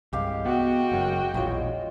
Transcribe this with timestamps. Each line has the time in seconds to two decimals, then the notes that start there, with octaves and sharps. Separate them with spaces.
0.13 C2 G2 G#3 G4 F5
0.45 B3 F#4 G5
0.92 F#1 F#2
1.34 E1 A#1 G#3 F4 C#5